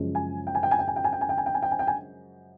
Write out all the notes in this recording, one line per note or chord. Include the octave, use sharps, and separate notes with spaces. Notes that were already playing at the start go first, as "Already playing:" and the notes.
Already playing: F#2 C#3 F3 G#3
G#5
G5
G#5
G5
G#5
G5
G#5
G5
G#5
G5
G#5
G5
G#5
G5
G#5
G5
G#5
G5
G#5